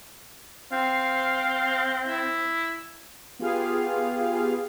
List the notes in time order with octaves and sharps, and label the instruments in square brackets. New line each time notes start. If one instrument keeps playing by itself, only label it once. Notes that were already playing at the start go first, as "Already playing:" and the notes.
[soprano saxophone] C4 [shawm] F5
[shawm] E4
[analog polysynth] B3 F4 G4 G#4 F5